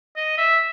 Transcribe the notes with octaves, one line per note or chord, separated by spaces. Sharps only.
D#5
E5